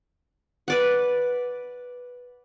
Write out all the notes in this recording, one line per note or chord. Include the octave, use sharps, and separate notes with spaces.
B4 D5 F#5